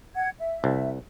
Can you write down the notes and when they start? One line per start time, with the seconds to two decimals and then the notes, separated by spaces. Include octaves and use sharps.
0.14 F#5 G#6
0.39 E5
0.64 C2